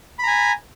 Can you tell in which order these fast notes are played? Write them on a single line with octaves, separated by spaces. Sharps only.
B5 A#5 G#5